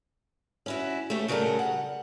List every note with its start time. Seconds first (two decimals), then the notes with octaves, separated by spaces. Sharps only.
0.66 C#4 E4 F#4
1.10 A3 G4 C#5
1.28 C#3 F#3 G3 A4 A#4
1.59 F#5